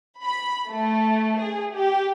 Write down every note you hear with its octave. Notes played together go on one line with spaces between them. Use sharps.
B5
A3
G#4
G4